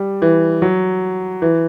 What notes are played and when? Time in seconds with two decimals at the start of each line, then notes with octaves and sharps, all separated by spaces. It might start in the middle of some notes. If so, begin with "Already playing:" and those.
Already playing: G3
0.22 E3
0.62 F#3
1.42 E3